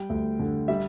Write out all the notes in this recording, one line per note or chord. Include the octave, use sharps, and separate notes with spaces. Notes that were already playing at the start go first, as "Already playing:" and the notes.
Already playing: G3 G5
D2
D3
G3 E5